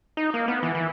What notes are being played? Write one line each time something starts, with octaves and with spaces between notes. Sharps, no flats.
D#4
A#3
B3
E3
E3